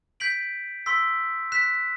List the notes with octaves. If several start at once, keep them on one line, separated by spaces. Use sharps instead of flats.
G6 B6 D7 F#7
C6 E6 B6
F#6 B6 E7